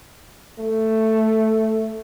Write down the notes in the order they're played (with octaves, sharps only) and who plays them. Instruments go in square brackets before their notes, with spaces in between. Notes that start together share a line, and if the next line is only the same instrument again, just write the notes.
[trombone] A3